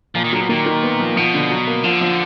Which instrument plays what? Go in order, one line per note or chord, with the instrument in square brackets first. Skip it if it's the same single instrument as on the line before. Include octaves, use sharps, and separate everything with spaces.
[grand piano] A#2 [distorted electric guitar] F3
[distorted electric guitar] D#3
[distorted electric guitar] D3 [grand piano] F#3
[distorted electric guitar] B2
[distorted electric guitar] A#2 [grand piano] D#3
[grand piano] D#3
B3
F3
[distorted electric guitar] B2 [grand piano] F3
[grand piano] D3
F#3
A#3
[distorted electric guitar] D3 [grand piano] F3
[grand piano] F3